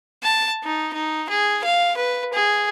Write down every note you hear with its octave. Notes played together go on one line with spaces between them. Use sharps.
A5
D#4
D#4
G#4
F5
B4
G#4